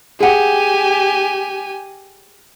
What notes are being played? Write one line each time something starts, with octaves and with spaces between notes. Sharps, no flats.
G4 G#4 F#5 G#5